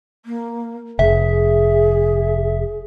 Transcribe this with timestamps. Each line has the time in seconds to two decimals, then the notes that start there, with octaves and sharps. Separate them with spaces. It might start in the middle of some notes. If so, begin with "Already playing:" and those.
0.25 A#3
0.99 F1 G#4 E5